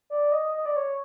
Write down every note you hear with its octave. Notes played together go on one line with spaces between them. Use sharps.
D5
D#5
D#5
D5
C#5